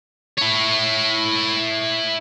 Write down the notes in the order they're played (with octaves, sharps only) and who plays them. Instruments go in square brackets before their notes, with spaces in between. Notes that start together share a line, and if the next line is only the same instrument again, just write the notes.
[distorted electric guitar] E4 C#5